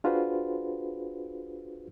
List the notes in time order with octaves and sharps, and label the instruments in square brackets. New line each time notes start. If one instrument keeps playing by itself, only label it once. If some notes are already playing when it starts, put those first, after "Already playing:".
[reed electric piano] D4 F4 F#4 G#4 B4 C5